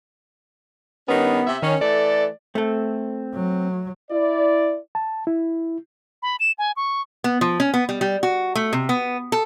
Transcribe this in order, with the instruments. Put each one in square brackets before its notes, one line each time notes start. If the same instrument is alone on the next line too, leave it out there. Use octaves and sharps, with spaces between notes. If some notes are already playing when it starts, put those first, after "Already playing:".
[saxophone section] G2 D#3 C#4 [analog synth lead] B3
[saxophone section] C3 E5
[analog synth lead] D#3 [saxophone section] C#4
[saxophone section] E3 A3 A4 [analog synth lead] D5
[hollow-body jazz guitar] A3 A4 [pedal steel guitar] C4
[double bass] F#3
[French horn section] E4 D5
[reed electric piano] A5
E4
[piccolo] B5
E7
G#5
C#6
[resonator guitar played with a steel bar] B3
F3
C#4
B3
G3
G3
F#4
A3
C3
B3
A4